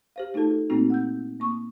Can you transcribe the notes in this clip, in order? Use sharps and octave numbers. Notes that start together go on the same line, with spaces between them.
G4 C5 F5
A3 D#4 F4 F#4 A4 A5
A4
A#2 A3 A#3 C4 D#4 F#4
F#5 E6 G6
A#3 C#6 D#6